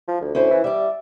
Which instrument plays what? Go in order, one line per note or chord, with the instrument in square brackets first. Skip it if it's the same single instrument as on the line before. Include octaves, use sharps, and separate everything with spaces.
[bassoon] F3
D2
[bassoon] D2 [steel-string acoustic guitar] C#4 E4 C5
[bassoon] E3
[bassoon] G3 [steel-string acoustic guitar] D5 E5